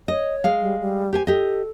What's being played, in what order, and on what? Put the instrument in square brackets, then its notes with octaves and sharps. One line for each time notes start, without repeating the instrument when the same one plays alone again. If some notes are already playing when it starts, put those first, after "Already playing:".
[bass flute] C#5 [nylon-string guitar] D#5
[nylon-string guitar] G#3 F5
[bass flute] G3
G3
[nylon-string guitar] G4 C5 G#5
[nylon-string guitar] G4 D#5 [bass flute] A4